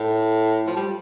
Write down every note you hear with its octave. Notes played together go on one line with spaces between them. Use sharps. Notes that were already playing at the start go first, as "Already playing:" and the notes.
Already playing: A2
F3
G3